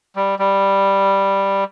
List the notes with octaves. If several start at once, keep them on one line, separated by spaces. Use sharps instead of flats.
G3
G3